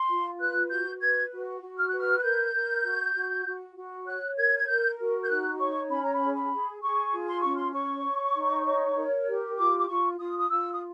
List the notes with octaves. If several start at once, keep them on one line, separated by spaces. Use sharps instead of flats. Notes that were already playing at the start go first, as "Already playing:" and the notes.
Already playing: C6
F4
B4 F#6
F#4 G6
B4 G#6
F#4
F#4
F6
B4 F#6
F6
F#6
A#4 G6
A#4
F#4
F#4
F#4
F#4
C#5 F#6
A#4 G#6
G#6
A#4 G6
F#4
G6
D#4 F#6
C#5 C#6
C#4 B5
A#5
B5
G#4
B5
G#4
G#4 C#6
F4
C6
C#4 C#6
C6
C#5 C#6
C#5
D#4
C#5
A#4
G4
F4 D6
D6
F4 C#6
F4 D#6
D#6
F4 E6
D#6